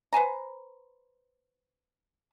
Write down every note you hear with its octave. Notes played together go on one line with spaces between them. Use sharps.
B4 C5 G#5 A#5